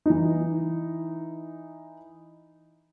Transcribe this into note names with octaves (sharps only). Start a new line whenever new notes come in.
E3 D#4